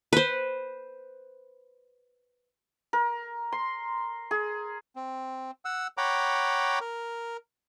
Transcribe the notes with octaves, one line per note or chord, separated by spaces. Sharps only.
B4 C5
A#4
C6
G#4
C4
F#5 E6
C#5 F#5 G5 A#5 B5 D6
A#4